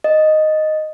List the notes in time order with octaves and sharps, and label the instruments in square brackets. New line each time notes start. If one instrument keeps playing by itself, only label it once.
[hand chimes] D#5